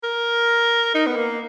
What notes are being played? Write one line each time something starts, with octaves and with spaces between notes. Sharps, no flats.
A#4
D#4
B3
A#3